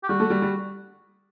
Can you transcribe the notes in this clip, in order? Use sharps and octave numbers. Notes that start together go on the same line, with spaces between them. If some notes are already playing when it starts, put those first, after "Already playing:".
G4
G3 F#4
A3
G3
G3